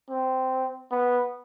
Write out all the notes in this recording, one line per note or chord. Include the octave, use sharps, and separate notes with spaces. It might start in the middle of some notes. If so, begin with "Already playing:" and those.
C4
B3